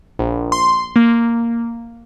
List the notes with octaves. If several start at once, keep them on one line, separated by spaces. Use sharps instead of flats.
A#1
C6
A#3